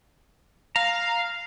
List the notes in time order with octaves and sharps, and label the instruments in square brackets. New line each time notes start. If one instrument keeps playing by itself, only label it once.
[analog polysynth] F5 [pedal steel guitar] A#5